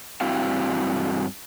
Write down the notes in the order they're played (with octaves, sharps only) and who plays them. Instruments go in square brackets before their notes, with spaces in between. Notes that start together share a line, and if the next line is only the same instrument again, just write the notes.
[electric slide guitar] G2 C4 E4 F#4 F5